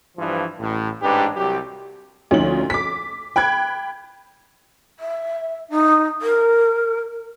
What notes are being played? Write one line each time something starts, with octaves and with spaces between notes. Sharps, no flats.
G2 E3 F3
A1 A2
A1 G#2 D4 G4 B4
C2 F#3 G4
D2 F3 C#4 D#4 F#7
D6 B6
G5 B5 F#6 G#6
E5
D#4
A#4